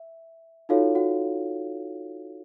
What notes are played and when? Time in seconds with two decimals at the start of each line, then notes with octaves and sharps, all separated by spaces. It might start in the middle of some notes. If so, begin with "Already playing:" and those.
Already playing: E5
0.69 D#4 F4 F#4 A4 C#5 F5
0.95 F#4 F#5